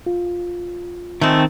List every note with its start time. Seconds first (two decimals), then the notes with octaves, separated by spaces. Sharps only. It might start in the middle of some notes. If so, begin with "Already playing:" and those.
0.06 F4
1.21 D#3 G#3 A3 C4